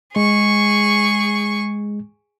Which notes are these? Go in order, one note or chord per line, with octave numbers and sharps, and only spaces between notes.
G#3 G#4 C#6